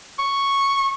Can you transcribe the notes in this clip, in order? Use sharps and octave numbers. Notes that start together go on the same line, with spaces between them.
C#6